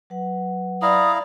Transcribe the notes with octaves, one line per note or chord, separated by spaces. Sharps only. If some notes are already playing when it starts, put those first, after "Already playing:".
F#3 B4 F#5
E4 D5 F5 A#5 D#6